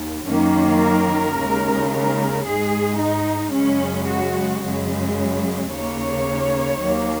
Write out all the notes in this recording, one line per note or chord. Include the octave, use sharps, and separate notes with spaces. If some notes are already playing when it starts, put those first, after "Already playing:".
Already playing: D#2
F#2 D#3 F#3 A#3 C#4
A#4
D#2 C#3 G#3
A#4
G#2 G#3 G#4
D#4
F#2 C#3 G#3 C#4
F#4
F#2 C#3 G#3
D#2 C#3 A#3 C#5
D#2 D#3 F#3 A#3